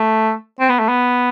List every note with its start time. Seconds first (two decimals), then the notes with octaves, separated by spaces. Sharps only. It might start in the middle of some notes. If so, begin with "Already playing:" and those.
Already playing: A3
0.60 C4
0.69 B3
0.79 A3
0.89 B3